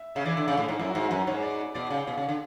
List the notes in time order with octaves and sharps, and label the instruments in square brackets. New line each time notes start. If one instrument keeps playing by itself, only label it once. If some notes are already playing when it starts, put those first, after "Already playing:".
Already playing: [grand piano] E5
[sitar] C#3 [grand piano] E5
[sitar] E3 [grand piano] D5
[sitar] D3 [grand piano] E5
[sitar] C#3 [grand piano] D5
[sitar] A2
G#2
[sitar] F#2 [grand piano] E4
[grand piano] F#4
[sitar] G#2
[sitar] F#2 [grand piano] B4
[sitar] G#2 [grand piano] C#5
[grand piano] D5
[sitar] B2 [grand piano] D5
[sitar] C#3
B2
C#3
D3